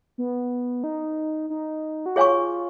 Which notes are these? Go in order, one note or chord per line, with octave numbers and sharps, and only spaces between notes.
B3
D#4
D#4
F#4
F4 G#4 C#5 F5 G#5 C#6